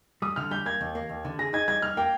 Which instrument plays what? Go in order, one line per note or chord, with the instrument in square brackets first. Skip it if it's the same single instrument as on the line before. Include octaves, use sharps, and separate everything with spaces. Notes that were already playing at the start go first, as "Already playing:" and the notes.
[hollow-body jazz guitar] G3 [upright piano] D#6
[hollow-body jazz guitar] D3 [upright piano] F6
[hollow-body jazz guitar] G3 [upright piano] G6
[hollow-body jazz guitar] A#3 [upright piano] G#6
[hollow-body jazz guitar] D#2
A#3
D#2
D3
[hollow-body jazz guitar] G#4 [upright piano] A#6
[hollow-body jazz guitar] D#4 [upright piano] G#6
[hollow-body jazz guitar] G3 [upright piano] G#6
[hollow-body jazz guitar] G3 [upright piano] F6
[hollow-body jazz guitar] A#3 [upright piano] G5